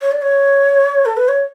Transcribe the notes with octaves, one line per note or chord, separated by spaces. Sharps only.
C#5
D5
C#5
A4
B4
C#5